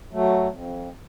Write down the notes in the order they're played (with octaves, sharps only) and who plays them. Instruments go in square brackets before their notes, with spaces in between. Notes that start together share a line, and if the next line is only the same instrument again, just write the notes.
[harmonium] F#3 A3
F2